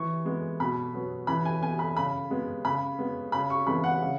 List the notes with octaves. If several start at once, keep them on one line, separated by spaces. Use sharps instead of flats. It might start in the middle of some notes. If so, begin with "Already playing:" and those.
Already playing: E3 C#6
G#3 B3
B2 B5
F#3 B3
E3 B5
G#5
B3 G#5
B5
C#3 B5
G#3 B3
C#3 B5
G#3 B3
C#3 B5
C#6
E3 G#3 B3 B5
F#5
C#3